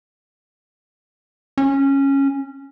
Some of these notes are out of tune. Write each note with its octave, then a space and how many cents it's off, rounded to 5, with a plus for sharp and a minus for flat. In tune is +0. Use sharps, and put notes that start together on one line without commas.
C#4 -10